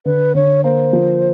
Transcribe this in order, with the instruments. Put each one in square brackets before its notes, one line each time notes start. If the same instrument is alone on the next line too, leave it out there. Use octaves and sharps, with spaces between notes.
[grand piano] D3 [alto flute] B4
[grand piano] D3 [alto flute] C#5
[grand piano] A#3 [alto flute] C5
[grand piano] F3